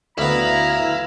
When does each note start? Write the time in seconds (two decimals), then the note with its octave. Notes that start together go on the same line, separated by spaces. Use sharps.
0.18 D2 B3 E4 F5 A#5